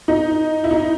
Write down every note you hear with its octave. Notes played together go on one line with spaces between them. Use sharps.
D#4
E4
D#4